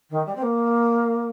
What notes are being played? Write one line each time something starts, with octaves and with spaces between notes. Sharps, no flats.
D#3
G3
C4
A#3